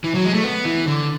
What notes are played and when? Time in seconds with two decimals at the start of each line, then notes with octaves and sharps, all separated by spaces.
0.04 E3
0.15 F#3
0.25 G#3
0.34 A3
0.44 B3
0.65 E3
0.87 D3